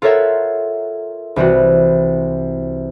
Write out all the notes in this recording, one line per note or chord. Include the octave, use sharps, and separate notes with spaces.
F4 A4 A#4 C#5 E5 F#5
C2 E3 G3 C4 F#4